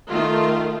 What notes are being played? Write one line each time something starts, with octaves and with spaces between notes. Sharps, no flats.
D#3 A3 F4